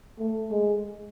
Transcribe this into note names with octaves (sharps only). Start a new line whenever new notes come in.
A3
G#3